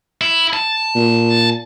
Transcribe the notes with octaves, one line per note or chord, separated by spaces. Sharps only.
E4
A5
A#2